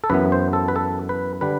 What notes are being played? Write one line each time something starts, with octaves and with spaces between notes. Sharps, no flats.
A4
F#2 E3 B3 B4
C5
A4
B4
A4
B4
D3 G3 B4